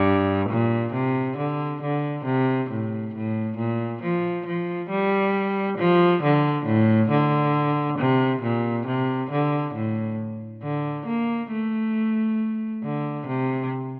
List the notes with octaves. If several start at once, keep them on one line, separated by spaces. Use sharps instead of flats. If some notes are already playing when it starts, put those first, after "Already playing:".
Already playing: G2
A#2
C3
D3
D3
C3
A2
A2
A#2
F3
F3
G3
F3
D3
A2
D3
C3
A#2
C3
D3
A2
D3
A#3
A3
D3
C3